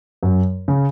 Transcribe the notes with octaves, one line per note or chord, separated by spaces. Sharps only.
F#2
C#3